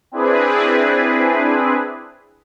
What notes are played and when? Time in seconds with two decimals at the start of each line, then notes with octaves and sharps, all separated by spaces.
0.12 C4 D4 E4 G#4 B4